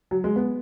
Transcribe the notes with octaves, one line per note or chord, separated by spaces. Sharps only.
F#3
G#3
B3